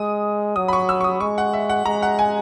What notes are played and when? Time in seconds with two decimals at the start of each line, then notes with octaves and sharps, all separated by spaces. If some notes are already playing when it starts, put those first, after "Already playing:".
Already playing: G#3 D#6
0.56 F#3 D#6
0.68 B5
0.73 C#6
0.89 E6
1.01 C#6
1.04 D#6
1.20 G#3 C#6
1.38 F#5
1.53 E5
1.69 F#5
1.85 G#3 A#5
2.02 F#5
2.19 G#5